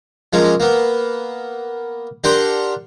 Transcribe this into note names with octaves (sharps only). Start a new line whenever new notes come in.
F3 G#3 A#3 C#4
A#3 B3
D4 G4 A#4 F#5 G5 C6